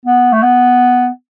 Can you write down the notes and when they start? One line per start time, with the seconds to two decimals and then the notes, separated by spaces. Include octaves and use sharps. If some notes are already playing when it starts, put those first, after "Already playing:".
0.06 B3
0.32 A3
0.43 B3